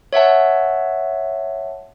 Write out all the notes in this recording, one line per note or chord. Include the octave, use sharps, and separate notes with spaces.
C#5 E5 F#5 A5